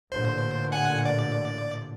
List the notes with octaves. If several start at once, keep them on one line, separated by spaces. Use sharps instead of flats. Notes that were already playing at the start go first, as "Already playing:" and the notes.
A1 A#2 D3 C5
F#5 G#5
D5